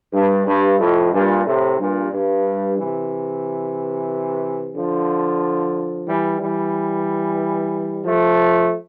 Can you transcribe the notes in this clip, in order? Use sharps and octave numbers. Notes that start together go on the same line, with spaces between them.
G2
G2
F2 A2
G2 A#2
A2 C3
G2 A#2
G2
C3 E3
D3 F3
E3 G3
E3 G3
F3 A3